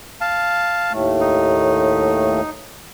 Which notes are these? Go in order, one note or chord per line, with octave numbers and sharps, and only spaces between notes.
F5 A5
D#2 A2 A3
D#4